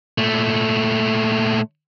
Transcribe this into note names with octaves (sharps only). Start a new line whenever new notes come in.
A#2 A3